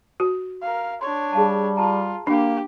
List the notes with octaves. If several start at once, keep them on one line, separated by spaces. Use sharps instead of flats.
F#4
A#4 F5
D4 C#5 C6
G3 G#4 F5 A5
F4 A5 A#5
A#3 D4 G4